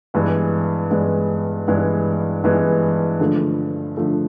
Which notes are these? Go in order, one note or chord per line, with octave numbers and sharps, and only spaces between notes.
G2 E3 G#3 B3
G2 E3 G#3 B3
G2 E3 G#3 B3
G2 E3 G#3 B3
D3 F3 A3
D3 F3 A3